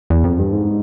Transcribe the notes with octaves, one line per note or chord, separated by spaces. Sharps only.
E2
F2
G2
G#2